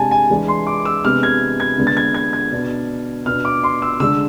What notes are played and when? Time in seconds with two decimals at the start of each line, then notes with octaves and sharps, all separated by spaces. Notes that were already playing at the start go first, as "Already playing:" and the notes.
Already playing: C3 G#3 D4 G#5 A5
0.11 G#5
0.30 E3 G#3 D4
0.48 C6
0.67 D6
0.85 E6
1.04 C3 G#3 B3 D4 F6
1.23 G#6
1.60 G#6
1.78 D3 G#3 B3 D4
1.87 A6
1.97 G#6
2.14 G#6
2.33 G#6
2.52 B2 B3 D4
3.26 B2 B3 D4 F6
3.45 D6
3.63 C6
3.82 E6
4.00 D3 G#3 D4 E6